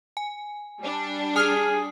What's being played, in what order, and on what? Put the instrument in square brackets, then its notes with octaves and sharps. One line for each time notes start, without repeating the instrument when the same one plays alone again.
[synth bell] G#5
[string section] G3 D4
[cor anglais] G#4 [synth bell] G#5 D#6 C7 [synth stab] F6